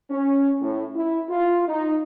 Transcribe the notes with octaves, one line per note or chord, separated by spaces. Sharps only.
C#4
A2
E4
F4
D#4